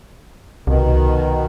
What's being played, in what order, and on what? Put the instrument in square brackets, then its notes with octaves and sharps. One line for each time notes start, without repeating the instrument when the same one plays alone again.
[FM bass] C2 [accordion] B2 D#3